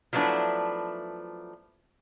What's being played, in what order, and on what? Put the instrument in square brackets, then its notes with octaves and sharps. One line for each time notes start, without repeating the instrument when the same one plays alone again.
[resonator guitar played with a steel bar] F3 F#3 A3 B3 D4 E4